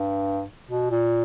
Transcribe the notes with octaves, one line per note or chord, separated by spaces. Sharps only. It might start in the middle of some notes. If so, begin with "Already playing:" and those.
Already playing: G2
B2
A#2